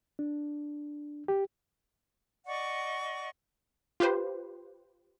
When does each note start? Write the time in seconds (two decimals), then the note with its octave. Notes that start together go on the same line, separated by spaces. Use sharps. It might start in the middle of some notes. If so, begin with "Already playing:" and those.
0.19 D4
1.28 G4
2.45 D5 D#5 F#5 C#6
4.00 F4 G4 B4 C5